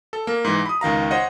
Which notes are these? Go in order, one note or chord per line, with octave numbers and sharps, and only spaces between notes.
A4
A#3
G#2 E3
B5 D#6
C#2 D#3 F5 A#5
C5 C#5 D#5 F#5